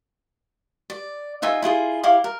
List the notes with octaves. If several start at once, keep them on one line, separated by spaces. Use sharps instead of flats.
D5
D#4 F4 E5 G#5
E4 F4 G#4 C6
E4 G4 F5 D6
A#4